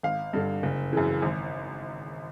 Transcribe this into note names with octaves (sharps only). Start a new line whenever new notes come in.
G#1 F5
G2 D3
F#1
F#2 C#3 E3
G#1